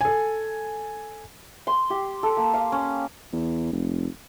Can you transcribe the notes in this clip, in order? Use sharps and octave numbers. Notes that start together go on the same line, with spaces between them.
A4 G#5
C6
G4
A4
A#3
F5
C#4
E2
F1